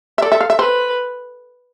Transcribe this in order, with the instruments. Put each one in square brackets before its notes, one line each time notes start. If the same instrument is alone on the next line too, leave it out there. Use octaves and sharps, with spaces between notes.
[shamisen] E5
[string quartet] A4 [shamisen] D5
[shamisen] E5
F5
E5
[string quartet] B4 [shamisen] C5